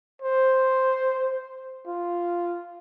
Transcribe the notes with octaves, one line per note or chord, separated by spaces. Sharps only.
C5
F4